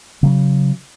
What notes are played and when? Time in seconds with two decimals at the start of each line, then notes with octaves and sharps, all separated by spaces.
0.23 C#3 F#3